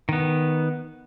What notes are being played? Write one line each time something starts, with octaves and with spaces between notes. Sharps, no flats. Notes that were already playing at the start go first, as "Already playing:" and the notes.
D#3 B3